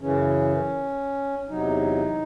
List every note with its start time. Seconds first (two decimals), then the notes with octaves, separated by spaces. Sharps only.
0.01 F#2 C#3 E3 C#4
1.49 E2 C3 F#3 D#4